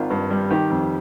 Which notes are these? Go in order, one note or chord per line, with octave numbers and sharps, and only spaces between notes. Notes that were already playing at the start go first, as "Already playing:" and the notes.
Already playing: G#1 D#3 F4
G2
G3
D#3 G4
F2